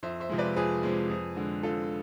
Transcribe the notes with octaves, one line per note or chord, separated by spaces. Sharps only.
F2 C5 E5
C5 E5
C3 F3 G#3
B4 D5
F2 G#4 B4
C3 F3 G#3
F2
D3 G#3
F2 F4 A4